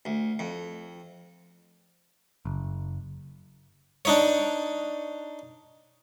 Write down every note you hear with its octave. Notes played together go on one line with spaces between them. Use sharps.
D2
F2
F#1
D4 D#4 C#5